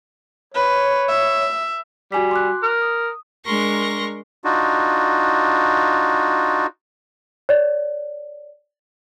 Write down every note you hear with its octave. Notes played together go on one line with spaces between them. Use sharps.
B4 C#5
E5
G3 F#4 G#5 B6
C6 D6 F#6
A#4
D#6
G#3 D4 A#4 C6 C#6 A#6
D4 D#4 F4 F#4
C#5 D5